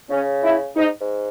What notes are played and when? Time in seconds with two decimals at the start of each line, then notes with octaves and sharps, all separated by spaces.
0.10 C#3 C#4
0.43 E4
0.77 G#2 D#4
1.01 G#2